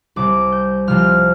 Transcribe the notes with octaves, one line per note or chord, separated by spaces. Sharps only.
C2 C3 G3 D6
G6
C2 C3 F3 F6